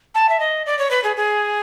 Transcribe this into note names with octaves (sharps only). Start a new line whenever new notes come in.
A5
E5
D#5
D5
C#5
B4
G#4
G#4